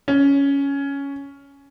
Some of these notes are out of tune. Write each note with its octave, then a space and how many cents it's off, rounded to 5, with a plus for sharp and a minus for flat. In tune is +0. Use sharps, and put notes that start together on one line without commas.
C#4 +10